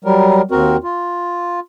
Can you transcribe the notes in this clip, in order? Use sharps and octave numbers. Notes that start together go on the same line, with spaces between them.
F#3 G3 A#4
D#2 C4 F#4 A#4
F4